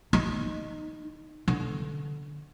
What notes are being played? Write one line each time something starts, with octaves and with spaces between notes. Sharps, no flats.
D#4
D3